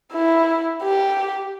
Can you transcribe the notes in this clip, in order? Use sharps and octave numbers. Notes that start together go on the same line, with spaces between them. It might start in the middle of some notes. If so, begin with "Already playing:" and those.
E4
G4